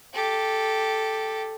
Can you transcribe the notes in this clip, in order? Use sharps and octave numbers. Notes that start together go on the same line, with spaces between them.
G4 A4